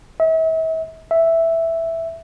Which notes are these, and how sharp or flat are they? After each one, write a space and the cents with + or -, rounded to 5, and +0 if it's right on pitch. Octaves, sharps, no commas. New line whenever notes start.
E5 -40
E5 +0